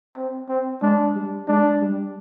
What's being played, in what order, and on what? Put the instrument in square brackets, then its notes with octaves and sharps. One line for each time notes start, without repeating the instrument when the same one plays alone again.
[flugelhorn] C4
C4
[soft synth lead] G#3 [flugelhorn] D4
[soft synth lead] G3
[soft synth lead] G#3 [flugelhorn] D4
[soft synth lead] G3